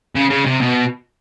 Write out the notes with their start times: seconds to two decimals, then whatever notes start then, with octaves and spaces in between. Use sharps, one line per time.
0.16 C#3
0.30 C#3
0.46 C3
0.62 B2